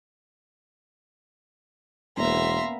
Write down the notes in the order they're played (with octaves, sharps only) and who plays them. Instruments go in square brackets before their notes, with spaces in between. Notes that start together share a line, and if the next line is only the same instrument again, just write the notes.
[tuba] E1 [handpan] A#3 B3 C#4 [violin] E5 A#5 [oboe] C6